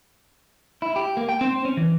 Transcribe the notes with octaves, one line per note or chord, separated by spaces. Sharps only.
E4
G4
A#3
G5
C4
C#4
E3